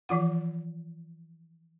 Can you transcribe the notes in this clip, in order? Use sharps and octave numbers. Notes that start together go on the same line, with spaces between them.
E3 F3 F4 F#5